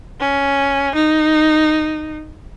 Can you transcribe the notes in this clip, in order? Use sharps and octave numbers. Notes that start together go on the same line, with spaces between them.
C#4
D#4